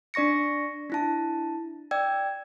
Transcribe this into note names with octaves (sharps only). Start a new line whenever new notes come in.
D4 D5 C#6 A#6 C#7
D4 E4 A5
D5 G5 E6 G#6